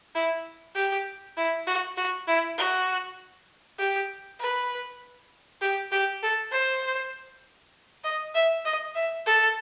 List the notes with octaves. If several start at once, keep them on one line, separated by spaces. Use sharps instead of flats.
E4
G4
E4
F#4
F#4
E4
F#4
G4
B4
G4
G4
A4
C5
D#5
E5
D#5
E5
A4